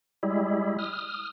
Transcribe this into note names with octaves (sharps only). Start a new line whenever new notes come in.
G3 G#3 E4
D#6 F6